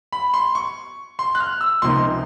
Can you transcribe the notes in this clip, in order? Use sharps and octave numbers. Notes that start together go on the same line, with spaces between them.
B5
C6
C#6
C6
F#6
F6
E6
C#2 C3 F3 A#3 D#4 C6